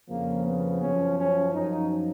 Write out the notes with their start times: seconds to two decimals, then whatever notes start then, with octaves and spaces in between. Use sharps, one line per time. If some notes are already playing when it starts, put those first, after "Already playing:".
0.09 F2 C#3 F3 A#3
0.45 B3
0.82 F#2 F3 C#4
1.18 C#4
1.54 F#2 F3 D#4